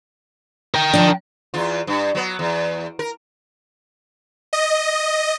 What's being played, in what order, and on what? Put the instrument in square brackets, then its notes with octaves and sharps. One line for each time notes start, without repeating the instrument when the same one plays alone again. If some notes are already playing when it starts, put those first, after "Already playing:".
[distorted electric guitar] A#4 G5
[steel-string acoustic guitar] F3 D4
[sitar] E2 F4
G2
F#3 B3
E2
A#4
[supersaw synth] D#5